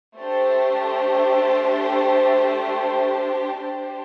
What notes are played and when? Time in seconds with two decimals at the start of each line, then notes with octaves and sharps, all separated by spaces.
0.16 A3 D4 G4 C5
3.59 D4 G4 C5